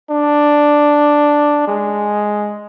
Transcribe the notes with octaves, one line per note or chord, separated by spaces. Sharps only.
D4
G#3